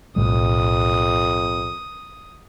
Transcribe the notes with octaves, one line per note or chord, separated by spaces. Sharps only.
B1 F2 A2 G3 D#6